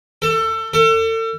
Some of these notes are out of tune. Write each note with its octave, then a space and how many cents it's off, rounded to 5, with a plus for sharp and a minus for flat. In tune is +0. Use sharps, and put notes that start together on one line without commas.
A4 +25
A4 +35